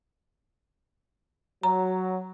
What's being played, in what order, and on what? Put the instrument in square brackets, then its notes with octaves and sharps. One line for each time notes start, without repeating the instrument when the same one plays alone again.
[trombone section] F#3 [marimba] A#5